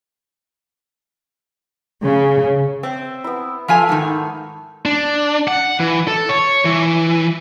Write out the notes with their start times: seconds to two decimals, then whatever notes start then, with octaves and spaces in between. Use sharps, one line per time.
2.03 C#3
2.83 C4 E5
3.24 B3 E4
3.68 F3 A3 F4 G#5 B5
3.89 G#2 D#3
4.86 D4
5.48 F#5
5.80 E3
6.08 A4
6.29 C#5
6.65 E3